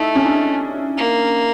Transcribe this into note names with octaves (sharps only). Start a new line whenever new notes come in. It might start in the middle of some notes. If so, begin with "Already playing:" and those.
Already playing: A3 D#4 E4
C#4
D4
A#3